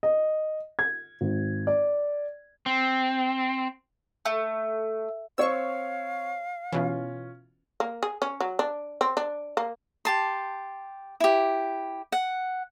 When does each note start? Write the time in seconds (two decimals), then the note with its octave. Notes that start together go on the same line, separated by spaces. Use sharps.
0.03 D#5
0.79 G#6
1.21 G#1
1.67 D5
2.66 C4
4.25 A3
5.38 C4 C#5 F5 C#6 E6
6.72 B2 E3 C#4 F4
7.80 A#3
8.03 G#4
8.22 C#4
8.40 F#3
8.59 D4
9.01 C4
9.17 D4
9.57 A#3
10.05 G4 A5 C6
11.20 E4 G4
12.12 F#5